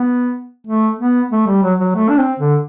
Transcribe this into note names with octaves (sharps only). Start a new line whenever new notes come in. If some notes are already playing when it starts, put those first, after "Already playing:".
Already playing: B3
A3
B3
A3
G3
F#3
F#3
A3
D4
C4
D3